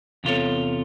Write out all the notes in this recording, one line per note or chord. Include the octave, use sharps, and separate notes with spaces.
E2 C3 F4 A4 C#5